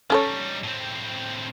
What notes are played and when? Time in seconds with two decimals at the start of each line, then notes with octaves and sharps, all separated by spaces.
0.10 G3 C#4 D#4 A4 C#5
0.63 A2 C4